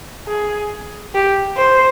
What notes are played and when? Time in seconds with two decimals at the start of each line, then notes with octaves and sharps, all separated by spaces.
0.27 G#4
1.14 G4
1.57 C5